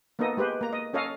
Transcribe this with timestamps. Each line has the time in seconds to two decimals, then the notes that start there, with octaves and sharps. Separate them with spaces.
0.19 A#3 B3 D#4 A4 D#5
0.37 G#3 G4 B4 C5
0.61 A#3 A#5
0.73 D#5
0.93 C#4 A4 C#5 D#5 F5